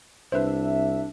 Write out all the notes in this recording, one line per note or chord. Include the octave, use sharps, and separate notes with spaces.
C2 D4 B4 C5 E5